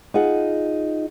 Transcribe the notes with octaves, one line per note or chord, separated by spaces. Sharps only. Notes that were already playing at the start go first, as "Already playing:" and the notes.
D#4 F4 G#4 F#5